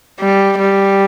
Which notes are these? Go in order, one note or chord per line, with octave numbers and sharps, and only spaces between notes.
G3
G3